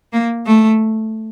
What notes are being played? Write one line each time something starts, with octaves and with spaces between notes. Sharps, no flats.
A#3
A3